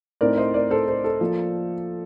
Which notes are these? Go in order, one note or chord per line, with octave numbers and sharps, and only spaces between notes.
A2 A3 C4 D#4 A#4 D5
C5 D#5
A#4 D5
A4 C5
A4 C5
A4
F3 A#3